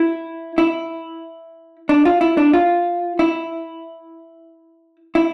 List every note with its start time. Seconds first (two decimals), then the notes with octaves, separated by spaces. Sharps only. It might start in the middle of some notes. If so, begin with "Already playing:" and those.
Already playing: E4
0.58 E4
1.89 D4
2.05 F4
2.21 E4
2.37 D4
2.53 F4
3.19 E4
5.15 E4